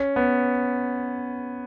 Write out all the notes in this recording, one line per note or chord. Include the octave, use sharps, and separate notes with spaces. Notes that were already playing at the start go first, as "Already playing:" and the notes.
Already playing: C#4
B3